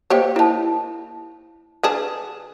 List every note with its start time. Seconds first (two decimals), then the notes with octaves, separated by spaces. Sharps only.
0.10 A#3 G4 C5 C#5 D#5 G5
0.36 A#3 D#4 E4 A5
1.83 D3 G#4 B4 A5